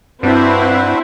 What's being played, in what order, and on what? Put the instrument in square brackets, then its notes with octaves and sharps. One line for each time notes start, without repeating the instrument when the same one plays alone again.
[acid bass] G2 [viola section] C4 E4 [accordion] D4 F#4 B4